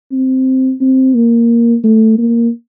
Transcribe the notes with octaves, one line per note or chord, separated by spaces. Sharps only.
C4
C4
A#3
A3
A#3